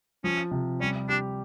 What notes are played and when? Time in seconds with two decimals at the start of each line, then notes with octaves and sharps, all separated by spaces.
0.24 F3 C#4
0.51 C3
0.80 G3 C#4
1.09 D4 G4